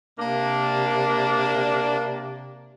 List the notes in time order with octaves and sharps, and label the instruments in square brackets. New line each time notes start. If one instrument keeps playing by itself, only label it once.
[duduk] C3 [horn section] A#3 D4